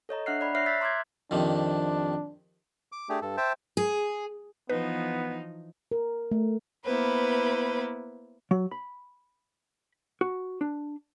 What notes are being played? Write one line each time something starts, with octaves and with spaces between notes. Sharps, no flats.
A4 C#5 D#5 A#5
D4 E5 F#5 F6 F#6 C7
D5 B5
C#5 E5 F6 F#6 A#6 C7
E5 E6 F#6 G6 A6 B6
A#5 C6 D6 F6 G6 G#6
F2 C3 D#3 D4
D6
A3 D4 G4 G#4
G2 A4
C5 E5 G5 A5
G#4
E3 F3 B3 D#4 B4
A#4
A3
A#3 B3 E4 B4 C5
F#3
B5
F#4
D4